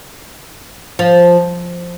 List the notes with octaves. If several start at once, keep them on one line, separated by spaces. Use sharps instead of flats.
F3